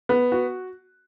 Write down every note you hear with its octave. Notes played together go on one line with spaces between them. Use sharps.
B3
F#4